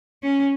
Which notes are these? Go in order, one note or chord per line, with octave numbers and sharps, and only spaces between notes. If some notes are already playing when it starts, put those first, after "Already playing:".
C#4